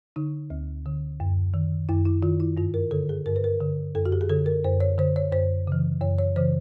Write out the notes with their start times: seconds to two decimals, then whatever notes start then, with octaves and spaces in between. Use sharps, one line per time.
0.16 D3 D#4
0.50 D2
0.86 D3
1.20 F#2
1.54 D#3
1.89 F#2 E4
2.05 E4
2.22 D#3 F4
2.40 E4
2.57 G2 F4
2.74 A#4
2.91 D3 A4
3.09 G#4
3.26 G2 A#4
3.36 B4
3.44 A#4
3.61 D3
3.95 F#2 A4
4.06 F#4
4.12 G4
4.21 G#4
4.29 D3 A4
4.46 A#4
4.64 F#2 C5
4.80 C#5
4.98 D3 C5
5.16 C#5
5.32 F#2 C5
5.67 C#3 E3
6.01 F#2 C#5
6.19 C#5
6.36 C#3 E3 C5